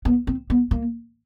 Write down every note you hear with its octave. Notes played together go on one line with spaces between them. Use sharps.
B3
C4
B3
A#3